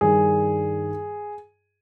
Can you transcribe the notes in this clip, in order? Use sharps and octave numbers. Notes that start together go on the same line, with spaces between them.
G2 D#3 G3 G#4